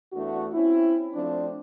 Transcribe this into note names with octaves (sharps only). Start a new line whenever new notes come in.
E2 A3 D4 F#4
C4 C#4 E4
F3 A3 C4 D4